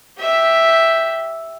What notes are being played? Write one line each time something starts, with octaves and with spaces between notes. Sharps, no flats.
G4 E5